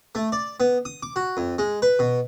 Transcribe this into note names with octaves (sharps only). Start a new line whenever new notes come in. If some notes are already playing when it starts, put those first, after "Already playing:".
A3
D5
B3
D#6
D6
F#4
F2
G#3
B4
B2